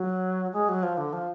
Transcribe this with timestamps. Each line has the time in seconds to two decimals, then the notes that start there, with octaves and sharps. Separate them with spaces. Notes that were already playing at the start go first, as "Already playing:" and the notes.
Already playing: F#3
0.53 G#3
0.69 F#3
0.83 F3
0.98 D3
1.13 F3